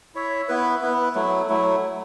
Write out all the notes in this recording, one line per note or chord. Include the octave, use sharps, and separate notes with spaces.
E4 C#5 E5
B3 E4 B4
B3 E4 B4
F#3 A3 E4
F#3 A3 E4